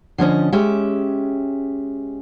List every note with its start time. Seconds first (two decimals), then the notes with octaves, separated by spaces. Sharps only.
0.18 D3 F3 C#4 D#5
0.53 G#3 C#4 G4 E5